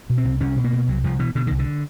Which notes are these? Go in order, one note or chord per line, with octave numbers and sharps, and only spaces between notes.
B2
C4
C2
C2 C#4
B2
A#3
B2
C2 F#3
C2 F3
B2 E3
B2 D3
C2 D#3
D3